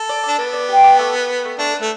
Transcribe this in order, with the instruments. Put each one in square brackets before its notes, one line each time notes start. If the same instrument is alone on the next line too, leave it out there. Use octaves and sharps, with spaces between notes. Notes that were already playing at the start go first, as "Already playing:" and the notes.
Already playing: [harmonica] A4
[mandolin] D5
[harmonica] D4 [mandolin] D5
[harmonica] B3 [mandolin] D5
[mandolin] D5
G4
D5
A3
B4
B4
A3
[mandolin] A3 [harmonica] D4
[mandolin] B4
[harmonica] A3